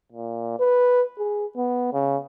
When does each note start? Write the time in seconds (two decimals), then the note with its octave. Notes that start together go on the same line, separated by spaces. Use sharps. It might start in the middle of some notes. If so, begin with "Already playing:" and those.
0.12 A#2
0.60 B4
1.19 G#4
1.57 B3
1.93 C#3